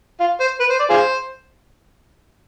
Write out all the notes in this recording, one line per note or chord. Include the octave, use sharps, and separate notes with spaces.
F4
C5
B4
C5
D5
F4 G#4 C5